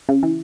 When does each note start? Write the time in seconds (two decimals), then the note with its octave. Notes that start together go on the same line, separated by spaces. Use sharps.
0.09 C#3
0.23 E3